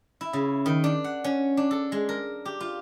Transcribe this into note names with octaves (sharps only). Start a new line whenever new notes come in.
E4
C#3
D#3
D4
F#5
C#4
D4
A4
G#3
A#4
G4
F4